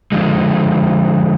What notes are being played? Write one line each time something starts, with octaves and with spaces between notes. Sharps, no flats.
D3 F3 G#3